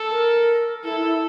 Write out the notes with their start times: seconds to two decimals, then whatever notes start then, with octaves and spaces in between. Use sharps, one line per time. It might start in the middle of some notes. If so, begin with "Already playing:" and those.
Already playing: A4
0.11 A#4
0.84 E4 A4
1.01 E4